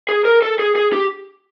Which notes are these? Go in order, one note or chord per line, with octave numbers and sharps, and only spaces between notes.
G#4
A#4
A4
G#4
G#4
G4